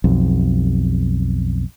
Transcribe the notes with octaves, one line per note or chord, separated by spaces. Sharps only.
B1 F2